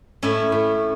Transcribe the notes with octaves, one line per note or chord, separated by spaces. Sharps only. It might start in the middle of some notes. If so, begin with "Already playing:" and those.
A2 C#4 E4
A2